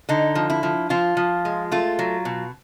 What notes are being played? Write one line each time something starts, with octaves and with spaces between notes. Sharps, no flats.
D3 D#4
F3
E4
F3
F3 F4
F3
G#3
A3 F4
F#3
B2